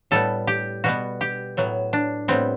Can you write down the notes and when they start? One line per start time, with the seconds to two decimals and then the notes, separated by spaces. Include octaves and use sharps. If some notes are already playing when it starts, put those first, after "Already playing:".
0.11 A2 G3 B3 A4
0.47 G4
0.84 B2 G3 B3 F#4
1.21 G4
1.57 A2 F#3 B3
1.93 D4
2.28 A2 G3 B3 C4